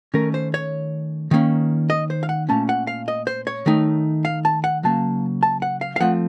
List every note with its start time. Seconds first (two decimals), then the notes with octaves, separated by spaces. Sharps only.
0.14 D#3 A3 C#4 A#4
0.34 C5
0.54 C#5
1.31 D#3 A#3 C#4
1.90 D#5
2.10 C5
2.23 F5
2.29 F#5
2.49 A#2 A3 C#4 A5
2.69 F#5
2.87 F5
3.08 D#5
3.27 C5
3.47 C#5
3.66 D#3 A3 D#4
4.25 F5
4.45 A5
4.64 F#5
4.83 C#3 F#3 A#3 A5
5.43 A5
5.62 F#5
5.81 F5
5.96 F5
6.00 F3 A3 C4 F#5